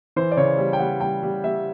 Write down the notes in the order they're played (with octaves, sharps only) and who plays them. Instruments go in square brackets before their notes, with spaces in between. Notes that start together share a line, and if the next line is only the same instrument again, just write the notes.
[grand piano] E3 C5
D5
C#3 C#5
G3
G5
G3 F#5
G3 G5
G3
G3 E5